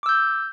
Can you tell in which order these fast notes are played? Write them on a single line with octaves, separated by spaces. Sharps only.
D6 E6 G6